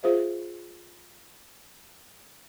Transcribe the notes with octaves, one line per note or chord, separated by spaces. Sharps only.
F4 G#4 C5 E5 F5